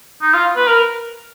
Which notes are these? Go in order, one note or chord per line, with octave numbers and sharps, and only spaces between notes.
D#4
F4
B4
A#4